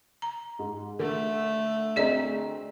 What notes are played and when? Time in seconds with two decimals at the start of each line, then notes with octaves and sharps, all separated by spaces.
0.22 A#5
0.59 G#2
0.99 D3 A3
1.96 D2 C4 G#4 D5 D#5 A#5